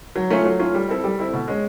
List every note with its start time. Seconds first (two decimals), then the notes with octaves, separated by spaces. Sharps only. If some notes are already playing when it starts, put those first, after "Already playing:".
0.16 F#3
0.30 A3 C#4 F4
0.45 F#3
0.59 A3 C#4 F4
0.74 G3
0.89 C4 E4 A4
1.04 G3
1.19 C4 E4 A4
1.33 B2
1.48 G#3 C#4